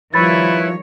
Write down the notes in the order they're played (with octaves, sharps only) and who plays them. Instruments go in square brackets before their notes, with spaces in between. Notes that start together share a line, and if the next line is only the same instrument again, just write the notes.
[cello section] D#3 G3 C#5 [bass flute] F3 [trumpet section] E4 B4 [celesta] B5 A6